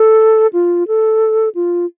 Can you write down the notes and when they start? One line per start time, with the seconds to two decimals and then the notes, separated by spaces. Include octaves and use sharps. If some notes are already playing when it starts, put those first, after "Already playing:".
Already playing: A4
0.53 F4
0.88 A4
1.55 F4